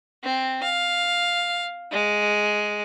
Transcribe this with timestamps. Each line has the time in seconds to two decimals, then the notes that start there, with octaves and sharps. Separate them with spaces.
0.24 C4
0.63 F5
1.92 G#3